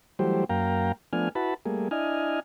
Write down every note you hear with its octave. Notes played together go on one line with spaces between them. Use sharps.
E3 F#3 G3 A3 G4 C5
F#2 A#3 F5 G5 A#5
F3 A3 B3 D4 G#5 F6
E4 F#4 B4 A5 B5
G3 A3 A#3 G#4
D4 E4 D#5 G#5 F6